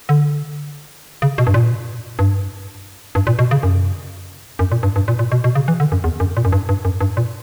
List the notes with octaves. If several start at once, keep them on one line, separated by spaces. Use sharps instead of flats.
D3
C#3
B2
G2
A#2
G2
G2
A#2
B2
C#3
F#2
F#2
A#2
G2
G2
A#2
A#2
B2
B2
C#3
E3
D3
F#2
E2
F#2
A#2
F#2
G2
G2
F#2
G2
A#2